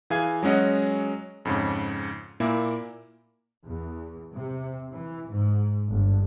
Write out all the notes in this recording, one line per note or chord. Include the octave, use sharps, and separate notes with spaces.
E3 G#4 F5 G#5 G#6
F#3 G#3 C#4 F#4 D#5
F2 G#2 C#3
A#2 A#3 E4
E2
C3
E3
G#2
G1